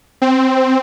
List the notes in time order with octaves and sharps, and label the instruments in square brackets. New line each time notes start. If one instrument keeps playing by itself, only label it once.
[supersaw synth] C4